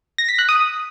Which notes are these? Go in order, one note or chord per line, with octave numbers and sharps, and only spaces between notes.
A#6
B6
F#6
D#6